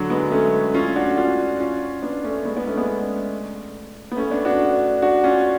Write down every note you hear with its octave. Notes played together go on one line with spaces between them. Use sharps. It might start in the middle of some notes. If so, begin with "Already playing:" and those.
Already playing: D3 F#3
G#3 B3
A3 C#4
C#4 F4
D4 F#4
C#4 F4
C#4 F4
B3 D4
A3 C#4
G#3 B3
B3 D4
A3 C#4
G#3 B3
B3
A3 C#4
B3 D4
D4 F#4
D4 F#4
C#4 F4